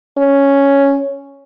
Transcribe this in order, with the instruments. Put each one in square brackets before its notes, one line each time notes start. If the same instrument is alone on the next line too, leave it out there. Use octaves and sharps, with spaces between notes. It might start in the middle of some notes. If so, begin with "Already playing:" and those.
[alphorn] C#4